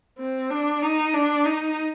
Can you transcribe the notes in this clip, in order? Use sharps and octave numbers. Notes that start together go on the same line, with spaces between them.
C4
D4
D#4
D4
D#4